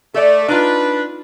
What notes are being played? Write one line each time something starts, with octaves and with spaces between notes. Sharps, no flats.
A3 A4 D5
D4 D#4 F4 B4